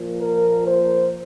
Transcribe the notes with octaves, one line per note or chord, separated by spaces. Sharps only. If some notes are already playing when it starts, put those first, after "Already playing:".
Already playing: A#2 F3 A#3
A#4
C5